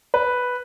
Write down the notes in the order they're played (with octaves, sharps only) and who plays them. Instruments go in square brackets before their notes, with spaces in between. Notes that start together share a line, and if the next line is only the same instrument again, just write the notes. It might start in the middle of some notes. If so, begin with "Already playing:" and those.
[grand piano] B4